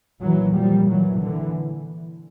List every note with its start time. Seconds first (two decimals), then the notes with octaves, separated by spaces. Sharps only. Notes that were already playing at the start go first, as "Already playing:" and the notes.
0.22 A#2 E3 F#3
0.56 F3 G3
0.88 E3 F#3
1.21 D3 E3